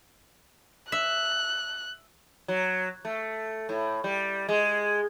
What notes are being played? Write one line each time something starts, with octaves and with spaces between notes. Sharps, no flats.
E5 F#6
F#3
A3
A2
G3
G#3